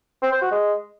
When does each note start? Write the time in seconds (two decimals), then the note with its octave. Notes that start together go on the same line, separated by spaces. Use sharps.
0.22 C4
0.32 C5
0.41 F#4
0.51 G#3